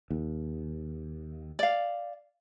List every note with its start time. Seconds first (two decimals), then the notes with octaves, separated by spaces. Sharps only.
0.10 D#2
1.59 D5 F5